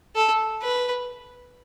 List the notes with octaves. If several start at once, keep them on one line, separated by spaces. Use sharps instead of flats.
A4
B4